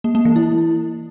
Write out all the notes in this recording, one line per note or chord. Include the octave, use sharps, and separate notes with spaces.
A#3
A#3
E3
E4